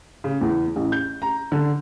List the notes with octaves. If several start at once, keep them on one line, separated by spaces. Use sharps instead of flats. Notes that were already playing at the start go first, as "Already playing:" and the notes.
C#3
E2
A1
G6
A#5
D3